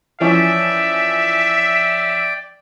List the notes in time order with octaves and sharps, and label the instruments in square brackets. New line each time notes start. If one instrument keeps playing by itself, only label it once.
[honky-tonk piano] E3 F3 C#4 [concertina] D5 G5 [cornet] E5